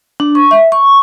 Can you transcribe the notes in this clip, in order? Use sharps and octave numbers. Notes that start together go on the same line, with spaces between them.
D4
C#6
E5
C#6